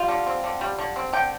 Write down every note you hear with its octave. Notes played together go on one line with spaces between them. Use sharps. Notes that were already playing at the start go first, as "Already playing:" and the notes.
Already playing: G3 F4
D3
C4
D3
G3
D3
C4
D3 G5